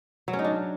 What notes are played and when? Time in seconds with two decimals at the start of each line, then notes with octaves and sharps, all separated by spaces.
0.28 F#3
0.33 C#4
0.39 D#4
0.44 D4